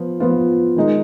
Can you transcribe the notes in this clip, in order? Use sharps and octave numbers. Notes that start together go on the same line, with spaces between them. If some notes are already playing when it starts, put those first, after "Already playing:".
Already playing: F3 B3 F4
F3 B3 F4
D#3 G#3 D#4